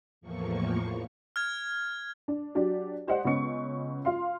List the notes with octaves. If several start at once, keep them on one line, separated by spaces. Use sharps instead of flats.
E2 A2 F3 A#3 C#6
F6 G#6
D4
F#3 D4 G4 D5
G4 C5 D5 D#5 F#5
C#2 B3 C#4 D#5 C#6 C#7
F4 F5 C6